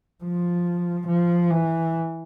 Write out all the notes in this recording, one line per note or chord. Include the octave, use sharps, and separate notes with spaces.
F3
F3
E3